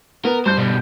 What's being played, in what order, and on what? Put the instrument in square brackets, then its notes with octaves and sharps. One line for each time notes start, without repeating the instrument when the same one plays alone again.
[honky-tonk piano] B3 [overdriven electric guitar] A#4
[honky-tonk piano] G2 G6 [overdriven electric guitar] C5
[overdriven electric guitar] B2 G3